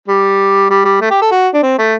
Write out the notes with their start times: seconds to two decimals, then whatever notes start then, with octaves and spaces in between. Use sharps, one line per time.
0.08 G3
0.70 G3
0.85 G3
1.01 A3
1.11 G4
1.22 A4
1.31 F#4
1.54 D4
1.63 C4
1.78 A3